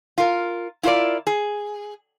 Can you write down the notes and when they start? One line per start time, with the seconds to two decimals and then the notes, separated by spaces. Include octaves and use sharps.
0.18 F4 A#4
0.83 E4 F4 A#4 C5 D5
1.27 G#4